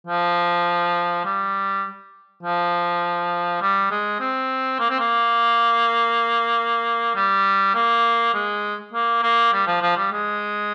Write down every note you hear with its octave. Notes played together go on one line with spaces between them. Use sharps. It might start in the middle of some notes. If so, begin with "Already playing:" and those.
F3
G3
F3
G3
G#3
C4
A#3
C4
A#3
G3
A#3
G#3
A#3
A#3
G3
F3
F3
G3
G#3